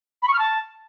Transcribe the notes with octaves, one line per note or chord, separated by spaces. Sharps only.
B5
C#6
F6
A5